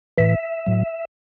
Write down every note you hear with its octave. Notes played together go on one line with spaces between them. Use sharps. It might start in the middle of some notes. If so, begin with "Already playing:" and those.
A2 E3 E5
A2 F#3